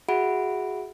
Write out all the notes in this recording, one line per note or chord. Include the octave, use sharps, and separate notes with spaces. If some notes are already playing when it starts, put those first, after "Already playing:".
F#4 G#4 E5 F#5 B5 D7